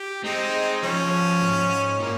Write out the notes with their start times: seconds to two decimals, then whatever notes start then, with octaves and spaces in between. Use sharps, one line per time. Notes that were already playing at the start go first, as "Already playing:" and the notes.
Already playing: G4
0.24 G#3 C4 D#4
0.82 F3 C#4
1.41 G#2
1.99 A#2 A#3